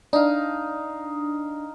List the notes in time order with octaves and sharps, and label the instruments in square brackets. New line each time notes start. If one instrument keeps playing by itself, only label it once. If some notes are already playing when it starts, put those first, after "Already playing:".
[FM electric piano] D4 [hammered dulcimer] D#4 F5